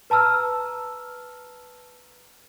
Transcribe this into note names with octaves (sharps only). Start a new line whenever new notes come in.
B4 A5 A#5 E6 F6